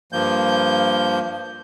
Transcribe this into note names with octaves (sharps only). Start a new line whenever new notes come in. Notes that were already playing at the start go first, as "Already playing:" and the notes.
G2 F3 A#3 G6